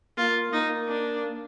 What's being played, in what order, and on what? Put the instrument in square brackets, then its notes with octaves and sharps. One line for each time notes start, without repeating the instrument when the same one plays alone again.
[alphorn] A#3 [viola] F4
[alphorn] A#3 [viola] D#4
[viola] D4